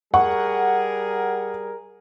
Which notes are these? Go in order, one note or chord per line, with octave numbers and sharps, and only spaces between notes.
G3 G#4 A#4 F#5 C#6